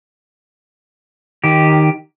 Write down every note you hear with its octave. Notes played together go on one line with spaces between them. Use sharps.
D#3 G4